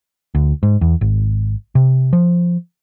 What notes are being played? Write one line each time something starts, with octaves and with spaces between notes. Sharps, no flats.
D2
G#2
E2
G#1
C3
F3